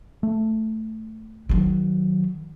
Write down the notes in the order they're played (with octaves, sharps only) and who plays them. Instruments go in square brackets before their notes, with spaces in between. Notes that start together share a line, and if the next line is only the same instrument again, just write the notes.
[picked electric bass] A3
[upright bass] D#3 F#3